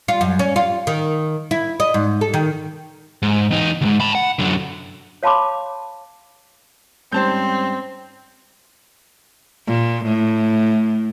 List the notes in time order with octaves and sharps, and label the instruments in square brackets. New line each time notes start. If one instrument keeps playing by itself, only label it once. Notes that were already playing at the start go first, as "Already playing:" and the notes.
[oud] F4
F#2
C#4
F4
D#3
E4
D#5
G#2
A4
D#3
[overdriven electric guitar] G#2
E2 D#4
D2 G#2
A5 B5
F#5
F#2 D3
[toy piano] C#5 F5 A5 B5 C6 D6
[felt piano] G#2 G3 C#4 [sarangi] C4 [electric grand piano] C5 A5 G6
[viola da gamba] A#2
A2